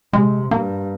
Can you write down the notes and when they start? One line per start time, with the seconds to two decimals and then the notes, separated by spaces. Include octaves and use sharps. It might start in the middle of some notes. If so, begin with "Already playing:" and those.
0.13 C3 G#3
0.51 G2 A#3